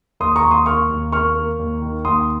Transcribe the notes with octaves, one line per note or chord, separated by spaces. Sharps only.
D#2 C6 D#6
A#5 C#6
D#2
C6 D#6
A#3 C#6 F6
D#2
A#3 C#6 F6
A#3
D#2
D#3
D#2 C6 D#6